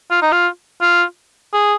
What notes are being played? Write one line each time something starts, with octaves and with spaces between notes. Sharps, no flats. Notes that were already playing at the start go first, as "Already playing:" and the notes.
F4
D#4
F4
F4
G#4